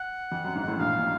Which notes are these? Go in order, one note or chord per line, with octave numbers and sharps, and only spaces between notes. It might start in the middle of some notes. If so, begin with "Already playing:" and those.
Already playing: F#5
F2
F#2
G#1 G#2
A1 A2
A#1 A#2 F5
A#2